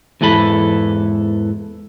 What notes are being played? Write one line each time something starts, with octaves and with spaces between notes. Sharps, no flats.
E2 G#2 E3 A4 B5